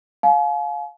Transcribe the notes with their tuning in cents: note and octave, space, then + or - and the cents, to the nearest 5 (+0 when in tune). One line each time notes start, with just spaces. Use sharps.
F5 +20 G#5 +45